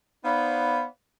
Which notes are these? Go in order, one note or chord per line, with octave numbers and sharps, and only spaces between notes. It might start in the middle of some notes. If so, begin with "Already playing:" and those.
B3 D#4 B4 C5 D5 F5